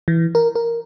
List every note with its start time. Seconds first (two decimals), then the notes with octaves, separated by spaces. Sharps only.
0.08 E3
0.35 A#4
0.55 A#4